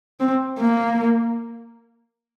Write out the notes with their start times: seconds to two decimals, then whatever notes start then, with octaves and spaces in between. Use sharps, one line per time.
0.20 C4
0.58 A#3